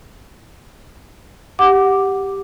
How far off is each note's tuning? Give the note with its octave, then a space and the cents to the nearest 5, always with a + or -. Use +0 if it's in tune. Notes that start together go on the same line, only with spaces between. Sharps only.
G4 +0 F#5 +0 D6 +0